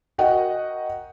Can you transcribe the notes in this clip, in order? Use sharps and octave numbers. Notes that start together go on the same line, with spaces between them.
F#4 A#4 D#5 F#5 G5